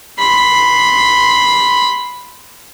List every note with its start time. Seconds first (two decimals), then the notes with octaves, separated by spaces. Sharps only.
0.19 B5 C6